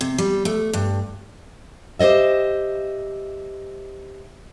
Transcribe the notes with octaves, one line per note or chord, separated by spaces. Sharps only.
C3
G3
A3
G2
G4 C5 C#5 D#5 E5